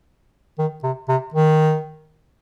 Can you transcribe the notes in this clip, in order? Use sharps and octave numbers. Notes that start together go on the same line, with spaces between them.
D#3
C3
C3
D#3